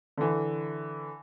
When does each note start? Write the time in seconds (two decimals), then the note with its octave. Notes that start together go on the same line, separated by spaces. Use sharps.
0.18 D3 E3